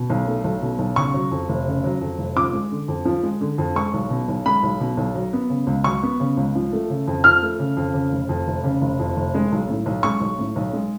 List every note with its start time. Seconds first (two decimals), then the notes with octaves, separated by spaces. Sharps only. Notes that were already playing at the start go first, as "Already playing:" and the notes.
Already playing: B2
0.10 B1
0.27 A3
0.44 B1
0.62 B2
0.79 B1
0.96 C#3 C#6
1.14 F#3
1.31 F2
1.49 F1
1.66 C#3
1.84 F#3
2.01 F2
2.18 F1
2.36 F3 D6
2.53 G#3
2.71 D3
2.88 F2
3.05 F3
3.23 G#3
3.41 D3
3.58 F2
3.75 G#3 C#6
3.93 B1
4.10 B2
4.28 B1
4.46 G#3 B5
4.63 B1
4.80 B2
4.97 B1
5.15 F#3
5.33 B3
5.50 C#3
5.67 C#2
5.84 F#3 C#6
6.03 B3
6.20 C#3
6.37 C#2
6.55 F3
6.73 A3
6.90 C#3
7.08 F2
7.24 F3 F6
7.42 A3
7.59 C#3
7.77 F2
7.94 C#3
8.12 F1
8.29 F2
8.47 F1
8.64 C#3
8.81 F1
9.00 F2
9.16 F1
9.34 G#3
9.52 B1
9.69 A2
9.86 B1
10.03 G#3 C#6
10.21 B1
10.39 A2
10.56 B1
10.73 G#3